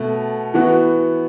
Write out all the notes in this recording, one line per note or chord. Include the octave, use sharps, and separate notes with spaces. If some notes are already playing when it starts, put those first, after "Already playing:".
Already playing: B2 A3
E3 B3 F#4